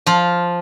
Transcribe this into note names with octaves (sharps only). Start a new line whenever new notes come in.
F3 F4